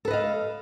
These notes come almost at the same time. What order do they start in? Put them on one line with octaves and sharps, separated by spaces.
A4 B4 D#5 F5